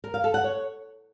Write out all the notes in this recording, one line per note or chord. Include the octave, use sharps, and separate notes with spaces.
A#4
F5
A4
F#5
C#5